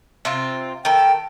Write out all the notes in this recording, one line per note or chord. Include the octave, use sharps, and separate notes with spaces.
C3 C4 F4
D#3 A4 G5